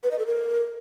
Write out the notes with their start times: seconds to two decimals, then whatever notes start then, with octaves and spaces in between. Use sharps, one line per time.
0.03 B4
0.11 D#5
0.19 A4
0.26 A#4